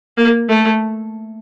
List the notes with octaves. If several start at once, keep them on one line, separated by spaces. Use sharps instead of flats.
A#3
A3